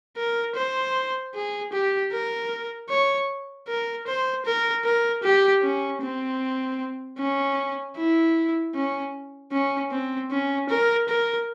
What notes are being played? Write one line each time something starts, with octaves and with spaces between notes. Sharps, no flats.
A#4
C5
G#4
G4
A#4
C#5
A#4
C5
A#4
A#4
G4
C#4
C4
C#4
E4
C#4
C#4
C4
C#4
A#4
A#4